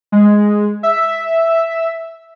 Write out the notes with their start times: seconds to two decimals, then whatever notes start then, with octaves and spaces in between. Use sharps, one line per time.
0.12 G#3
0.83 E5